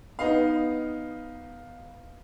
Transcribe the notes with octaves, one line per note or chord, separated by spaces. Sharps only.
B3 D#4 F5